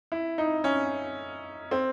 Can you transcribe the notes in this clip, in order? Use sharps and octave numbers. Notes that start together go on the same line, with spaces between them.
E4
D#4
C#4
C4